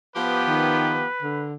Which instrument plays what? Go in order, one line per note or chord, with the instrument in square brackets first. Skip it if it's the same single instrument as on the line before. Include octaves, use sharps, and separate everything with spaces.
[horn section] F3 B3 G4 [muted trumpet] B4
[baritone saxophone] D#3
D3